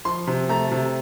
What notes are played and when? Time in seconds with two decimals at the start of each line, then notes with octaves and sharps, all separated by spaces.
0.05 F3 C6
0.27 C3
0.49 A3 A#5
0.71 C3